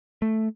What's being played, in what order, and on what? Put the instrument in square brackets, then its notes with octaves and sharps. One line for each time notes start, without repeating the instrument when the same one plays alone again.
[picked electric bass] A3